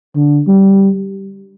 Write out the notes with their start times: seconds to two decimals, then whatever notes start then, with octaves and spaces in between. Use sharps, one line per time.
0.16 D3
0.48 G3